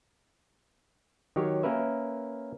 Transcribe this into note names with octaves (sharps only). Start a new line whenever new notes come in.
D#3 F#3 G4 C#5
A#3 C#4 A#4 B4 E5